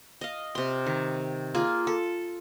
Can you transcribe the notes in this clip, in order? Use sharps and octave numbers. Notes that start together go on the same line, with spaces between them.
D#5 F5
C3 C6
D#3
A#3 F4 G#4
A4